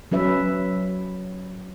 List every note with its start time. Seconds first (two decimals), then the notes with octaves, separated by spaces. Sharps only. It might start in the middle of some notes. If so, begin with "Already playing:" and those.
0.12 F#3 C#4 B4 E5